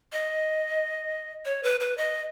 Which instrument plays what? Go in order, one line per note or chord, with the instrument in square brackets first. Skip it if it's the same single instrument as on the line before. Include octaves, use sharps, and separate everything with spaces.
[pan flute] D#5
C#5
B4
B4
D#5